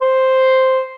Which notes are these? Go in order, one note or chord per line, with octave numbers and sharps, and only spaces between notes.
C5